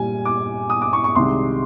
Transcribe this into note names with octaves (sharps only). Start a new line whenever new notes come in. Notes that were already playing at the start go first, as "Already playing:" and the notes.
Already playing: A#2 G3 G#5
D6
D#6
D6
C#6
C#6
C2 C3 D#3 G#3 C6